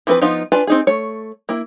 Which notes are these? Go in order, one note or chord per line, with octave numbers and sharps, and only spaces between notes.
E3 F3 C4 G#4 B4
F3 B3 D#4 F4
D4 F4 B4 G#5 A5
C4 D#4 G#4
A3 C#5
A#3 E4